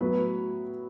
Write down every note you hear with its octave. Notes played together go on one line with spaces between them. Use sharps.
A2 F#3 B3 B4